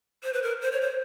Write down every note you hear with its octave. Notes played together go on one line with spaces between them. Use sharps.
C5
B4
A#4
C5
C#5
C5